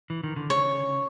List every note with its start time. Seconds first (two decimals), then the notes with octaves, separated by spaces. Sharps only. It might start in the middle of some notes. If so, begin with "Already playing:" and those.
0.10 E3
0.24 D#3
0.36 D3
0.49 C#3 C#5